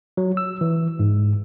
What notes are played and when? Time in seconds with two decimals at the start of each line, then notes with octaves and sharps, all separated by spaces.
0.17 F#3
0.37 E6
0.61 E3
0.99 G#2